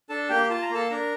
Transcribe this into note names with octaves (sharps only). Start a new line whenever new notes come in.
D4 A4 A5
A#3 G4 G5
F4 A5
A#5
A#3 A4 A5
D4 A#4 A#5